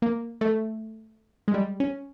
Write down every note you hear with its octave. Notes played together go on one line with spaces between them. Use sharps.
A#3
A3
G#3
G3
C#4